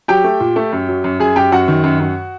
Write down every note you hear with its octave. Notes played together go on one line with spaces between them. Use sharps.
F#3 G4 G5
A3
A#2
A3
F#2
F#3
F#2
F#2 G#4 G#5
F#2 G4 G5
F#2 F#4 F#5
D#3
F#2
F#2